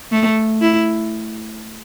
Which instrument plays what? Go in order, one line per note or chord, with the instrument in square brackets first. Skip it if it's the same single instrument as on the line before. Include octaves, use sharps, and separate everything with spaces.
[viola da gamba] A3
E4